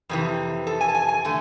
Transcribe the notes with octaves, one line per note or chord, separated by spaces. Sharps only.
F2 C3 E3
A4
G#5
A5
G#5
G#5
D3 A3